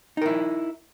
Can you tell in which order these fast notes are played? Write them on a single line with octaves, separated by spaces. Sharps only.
D#4 A#4 E4